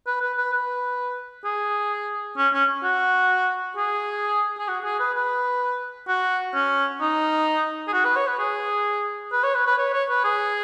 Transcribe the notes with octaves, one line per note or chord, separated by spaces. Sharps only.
B4
B4
B4
B4
G#4
C#4
C#4
F#4
G#4
G#4
F#4
G#4
B4
B4
F#4
C#4
D#4
G#4
F#4
B4
C#5
B4
G#4
B4
C#5
B4
B4
C#5
C#5
B4
G#4